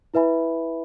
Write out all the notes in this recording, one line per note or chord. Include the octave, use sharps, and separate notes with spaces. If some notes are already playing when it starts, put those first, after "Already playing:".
E4 B4 E5 G#5 B5